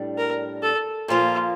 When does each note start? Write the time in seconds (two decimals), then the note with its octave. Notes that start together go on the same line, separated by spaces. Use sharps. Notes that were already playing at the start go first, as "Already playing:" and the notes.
Already playing: A2 G3 D4
0.18 A#4
0.62 A4
1.08 A#2 F3 A#3 F4